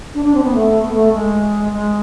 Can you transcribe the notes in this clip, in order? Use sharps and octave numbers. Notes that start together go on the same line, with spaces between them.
D4
D4
C4
B3
A3
B3
A3
G#3
G#3